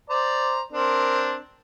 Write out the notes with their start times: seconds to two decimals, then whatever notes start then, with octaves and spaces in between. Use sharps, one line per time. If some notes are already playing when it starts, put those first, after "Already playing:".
0.10 C5 D5 A#5
0.72 C4 D4 A#4